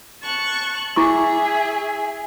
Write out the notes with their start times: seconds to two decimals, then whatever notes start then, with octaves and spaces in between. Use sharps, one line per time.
0.21 A5 C#6 F#6
0.96 E4 G#4 E5 C#6 D6